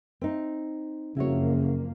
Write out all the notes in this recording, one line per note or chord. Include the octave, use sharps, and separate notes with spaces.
C4 D#4
F#1 F2 C#3 A#3 E4 F#4 C#5